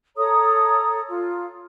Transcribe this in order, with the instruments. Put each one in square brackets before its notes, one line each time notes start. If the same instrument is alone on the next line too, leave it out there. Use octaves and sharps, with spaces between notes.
[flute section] A4 C#5 A#5 D#6
F4